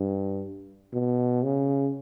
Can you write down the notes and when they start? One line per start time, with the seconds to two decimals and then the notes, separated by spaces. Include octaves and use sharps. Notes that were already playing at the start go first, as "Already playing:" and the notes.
Already playing: G2
0.93 B2
1.43 C#3